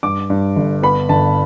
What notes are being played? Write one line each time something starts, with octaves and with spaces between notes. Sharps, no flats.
G2 D6
G2
G1
B3 B5
G1 A5